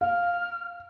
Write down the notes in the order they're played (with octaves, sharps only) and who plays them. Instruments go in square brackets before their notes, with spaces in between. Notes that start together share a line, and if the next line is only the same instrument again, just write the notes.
[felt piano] F5 [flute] F6